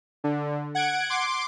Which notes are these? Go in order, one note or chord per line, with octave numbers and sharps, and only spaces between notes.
D3
F#5 G#6 D7
C6 D6 D7